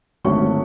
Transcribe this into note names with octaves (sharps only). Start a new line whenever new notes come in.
G#1 F#2 D3 A3 C#4 C#6